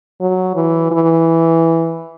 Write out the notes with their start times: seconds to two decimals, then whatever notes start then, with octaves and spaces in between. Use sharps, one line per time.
0.21 F#3
0.55 E3
0.91 E3